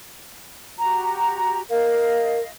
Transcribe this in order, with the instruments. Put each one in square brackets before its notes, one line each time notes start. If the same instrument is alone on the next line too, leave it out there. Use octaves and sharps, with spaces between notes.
[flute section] F#4 G4 A#5
[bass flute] A#4 [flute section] D#5 F5